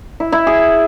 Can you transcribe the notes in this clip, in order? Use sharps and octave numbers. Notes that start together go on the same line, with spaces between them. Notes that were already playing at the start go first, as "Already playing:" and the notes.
E4
E4
G#4